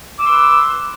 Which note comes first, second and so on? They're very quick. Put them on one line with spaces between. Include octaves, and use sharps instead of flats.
D6 E6 C6 B4